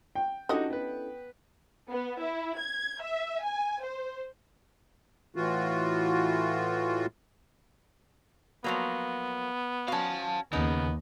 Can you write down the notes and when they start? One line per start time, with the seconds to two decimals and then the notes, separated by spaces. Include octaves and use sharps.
0.15 G5
0.49 D3 C#4 D#4 E4 F#4 G4 A4 D#5
0.70 B3 B4
1.90 B3
2.22 E4
2.58 G#6
3.02 E5
3.44 G#5
3.84 C5
5.36 A2 E3 F4 F#4
8.64 F3 F#3 A#3 B3
9.88 C#4 F#4 F5 A5
10.53 D#2 C#3 B3 D#4